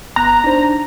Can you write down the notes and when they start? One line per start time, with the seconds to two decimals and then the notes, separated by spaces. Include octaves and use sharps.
0.16 G1 B3 A#5 F#6
0.44 D4 D#4 C5